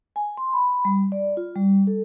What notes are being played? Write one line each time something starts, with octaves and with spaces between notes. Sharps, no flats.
G#5
C6
B5
G3
D5
F4
G3
A4